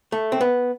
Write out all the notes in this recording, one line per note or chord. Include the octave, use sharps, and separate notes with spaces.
A3
C4
B3